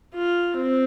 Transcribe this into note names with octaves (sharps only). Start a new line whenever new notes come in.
F4
C4